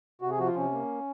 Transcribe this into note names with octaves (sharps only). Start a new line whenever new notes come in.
C3 F#4
G#4
F3 F#4
F4
C3 C#4
A#3